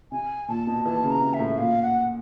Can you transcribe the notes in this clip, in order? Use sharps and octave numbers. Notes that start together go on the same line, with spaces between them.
C3 G#5
A#2 A5
B2
E3 A5
C#3
A#5
C3
E5
A2
A#2 F5
F#5